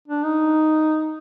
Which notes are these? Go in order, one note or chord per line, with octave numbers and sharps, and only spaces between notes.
D4
D#4